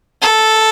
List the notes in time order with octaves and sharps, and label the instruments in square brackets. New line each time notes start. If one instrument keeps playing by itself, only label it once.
[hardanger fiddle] A4